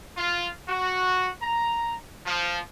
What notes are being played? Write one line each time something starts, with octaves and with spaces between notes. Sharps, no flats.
F4
F#4
A#5
F3